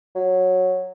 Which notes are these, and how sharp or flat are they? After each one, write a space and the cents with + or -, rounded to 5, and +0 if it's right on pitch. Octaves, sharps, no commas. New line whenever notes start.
F#3 -10